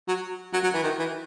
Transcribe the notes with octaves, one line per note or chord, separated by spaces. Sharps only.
F#3
F#3
F#3
E3
D#3
E3